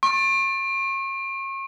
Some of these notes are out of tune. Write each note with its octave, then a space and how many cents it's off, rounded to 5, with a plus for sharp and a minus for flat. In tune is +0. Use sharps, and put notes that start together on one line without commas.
C#6 -40